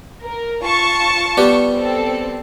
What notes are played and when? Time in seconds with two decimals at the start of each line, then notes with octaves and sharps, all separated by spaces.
0.23 A#4
0.63 F4 A5 C#6
1.37 G3 B3 G4
1.73 C4 A4